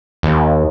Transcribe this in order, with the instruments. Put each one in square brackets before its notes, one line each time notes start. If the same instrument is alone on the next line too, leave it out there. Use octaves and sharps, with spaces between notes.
[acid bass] D#2